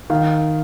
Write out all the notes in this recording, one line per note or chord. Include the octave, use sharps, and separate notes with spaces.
D#3 F5